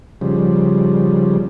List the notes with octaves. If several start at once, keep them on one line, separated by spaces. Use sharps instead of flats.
C#3 F3 G3